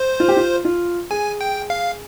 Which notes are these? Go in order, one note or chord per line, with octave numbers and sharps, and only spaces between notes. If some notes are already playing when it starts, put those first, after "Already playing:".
Already playing: C5
F4
G4
F4
F4
G#4 G#5
G5
F5